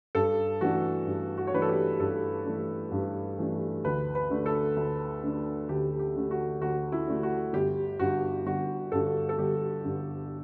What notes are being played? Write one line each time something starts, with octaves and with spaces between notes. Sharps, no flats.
G2 A4
E3 A3 D4 F#4
G2
F#4
C#5
E3 A3 D4 B4
A4
G4
G2 A4
E3 A3 D4
G2
E3 A3 D4
D2 B4
B4
D3 A3 D4
A4
D2
D3 A3 D4
D2 G4
G4
D3 A3 D4
F#4
D2 F#4
E4
D3 A3 D4
F#4
G1 G4
G2 D3 F#4
G1 F#4
G2 D3 A4
A4
G1 G4
G2 D3